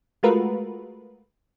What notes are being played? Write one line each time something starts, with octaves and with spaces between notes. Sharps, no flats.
G#3 A3 F4 F#4 A#4 B4